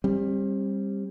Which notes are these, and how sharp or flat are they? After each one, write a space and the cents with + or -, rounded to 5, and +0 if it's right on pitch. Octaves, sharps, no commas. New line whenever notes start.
G3 +15 C4 +35